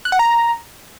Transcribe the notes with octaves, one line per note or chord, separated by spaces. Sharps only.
F#6
F#5
A#5